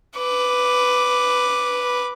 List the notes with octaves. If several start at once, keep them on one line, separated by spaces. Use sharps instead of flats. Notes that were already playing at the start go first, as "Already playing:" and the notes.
B4 D6